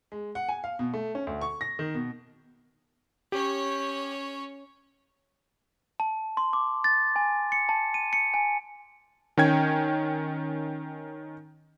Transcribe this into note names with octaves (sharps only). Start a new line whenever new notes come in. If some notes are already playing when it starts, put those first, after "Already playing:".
G#3
F#5
G#5
F5
B2
A3
C#4
D2
C#6
A#6
D#3
B2
C#4 G4 C#5
A5
C6
D6
A6
G#5
C#7
A5
D#7
C#7
G#5
D#3 C#4 G5 G#6